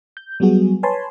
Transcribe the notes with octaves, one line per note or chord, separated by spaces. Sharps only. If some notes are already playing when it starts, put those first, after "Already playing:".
G6
F#3 G3 B3 F#4 G#4
B4 C#5 G#5 A5 B5 C6